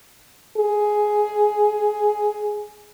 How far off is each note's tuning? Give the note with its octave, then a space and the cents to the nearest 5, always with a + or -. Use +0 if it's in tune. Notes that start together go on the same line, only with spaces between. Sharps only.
G#4 +10